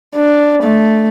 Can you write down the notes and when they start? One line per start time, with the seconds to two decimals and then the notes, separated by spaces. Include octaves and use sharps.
0.16 D4
0.63 A3